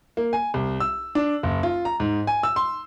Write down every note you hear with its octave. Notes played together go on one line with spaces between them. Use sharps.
A#3
G#5
C2
E6
D4
F#1
F4
A#5
G#2
G#5
E6
C6